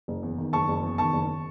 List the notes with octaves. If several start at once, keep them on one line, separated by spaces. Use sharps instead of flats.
F#1
E2
D#3
F#1 A5 C#6
F#1
E2
D#3 A5 C#6
F#1